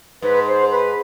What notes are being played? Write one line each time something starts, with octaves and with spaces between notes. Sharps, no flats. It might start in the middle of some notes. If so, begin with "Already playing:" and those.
G#2 B4
C5
B4